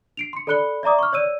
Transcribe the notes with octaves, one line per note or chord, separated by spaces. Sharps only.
C7 D7 F7
C6 C#7
A4 D5 B5 F#6 C#7 G7
D5 E5 A#5 D6 D#6
C#6 F6
C#5 D5 E6 D#7